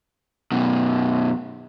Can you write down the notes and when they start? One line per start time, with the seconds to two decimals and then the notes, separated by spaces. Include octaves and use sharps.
0.52 F#2 B2